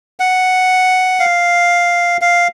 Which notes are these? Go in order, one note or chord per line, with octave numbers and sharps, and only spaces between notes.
F#5
F5
F5